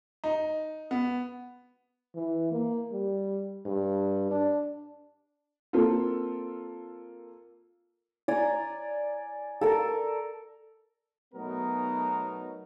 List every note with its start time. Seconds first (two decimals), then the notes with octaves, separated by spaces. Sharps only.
0.24 D#4
0.91 B3
2.15 E3
2.52 A#3
2.92 G3
3.65 G2
4.31 D4
5.73 A#3 C4 F4 A4
8.28 D5 G#5 A#5
9.61 A4 A#4 A5
11.34 B2 F#3 A3 B3 D#4 A#4